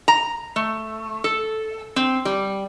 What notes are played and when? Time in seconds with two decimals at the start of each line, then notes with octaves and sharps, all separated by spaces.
0.08 A#5
0.56 A3
1.24 A4
1.96 C4
2.25 G3